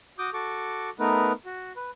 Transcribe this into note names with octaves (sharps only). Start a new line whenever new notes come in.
F#4 D6 D#6 G6
F#4 A4 C#6 D6
A3 B3 D#4 A#4 B4
F#4
B4